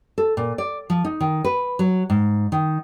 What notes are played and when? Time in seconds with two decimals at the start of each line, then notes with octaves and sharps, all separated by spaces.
0.18 A4
0.37 A#2
0.58 D5
0.90 F3
1.05 D#4
1.20 D#3
1.44 B4
1.79 F#3
2.10 G#2
2.52 D#3